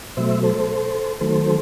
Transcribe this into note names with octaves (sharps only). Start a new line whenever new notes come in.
B2 F#3 A3 C5 E5
A4 C5
D#3 F#3 A3 A4 C5